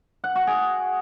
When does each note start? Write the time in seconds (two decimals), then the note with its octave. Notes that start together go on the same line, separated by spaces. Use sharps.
0.24 F#5
0.35 F#4
0.47 G#4